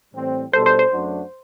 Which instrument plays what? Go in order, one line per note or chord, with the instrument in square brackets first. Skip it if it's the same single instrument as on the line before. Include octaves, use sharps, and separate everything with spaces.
[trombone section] A2 E3 G3 C4
[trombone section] B2 G3 D4 A4 [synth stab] C5
[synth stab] C5
C5
[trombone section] F#2 F#3 A3 D4 F#4